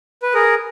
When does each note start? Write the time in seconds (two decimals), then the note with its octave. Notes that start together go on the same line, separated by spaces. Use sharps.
0.22 B4
0.34 G#4 A#4